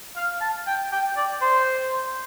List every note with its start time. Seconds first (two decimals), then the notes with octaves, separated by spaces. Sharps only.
0.16 F5
0.41 A5
0.67 G5
0.92 G5
1.17 D5
1.42 C5